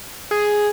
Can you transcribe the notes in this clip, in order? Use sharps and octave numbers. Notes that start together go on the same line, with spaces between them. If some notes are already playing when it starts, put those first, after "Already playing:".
G#4